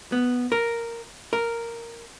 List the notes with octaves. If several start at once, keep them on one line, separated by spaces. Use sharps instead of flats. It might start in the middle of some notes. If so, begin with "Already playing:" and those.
B3
A#4
A#4